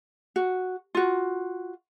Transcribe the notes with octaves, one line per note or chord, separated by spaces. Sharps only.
F#4
F4 F#4